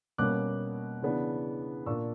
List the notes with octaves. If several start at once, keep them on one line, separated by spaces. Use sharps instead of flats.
B2 G3 A#3 C#4 D6 F#6
C#3 E3 B3 D4
A#2 A#3 D4 C#6 E6